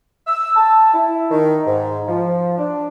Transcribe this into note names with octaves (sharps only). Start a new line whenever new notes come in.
E6
A5
E4
D#3
G#2
F3
D4